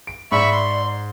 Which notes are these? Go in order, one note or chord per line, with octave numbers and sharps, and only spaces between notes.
D7
G#2 D5 E5 B5 C#6
C6